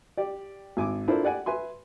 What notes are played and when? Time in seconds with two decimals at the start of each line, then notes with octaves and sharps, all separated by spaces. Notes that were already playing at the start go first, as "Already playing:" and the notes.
0.17 G4 D5
0.77 G#1 G#5 D6
1.08 D4 E4 F4 A4 A#4 C5
1.24 G4 D5 F#5 G#5
1.46 B4 E5 G#5 C6